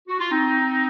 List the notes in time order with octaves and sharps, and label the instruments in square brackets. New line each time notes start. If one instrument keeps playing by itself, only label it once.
[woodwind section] F#4
F4
C4 D#4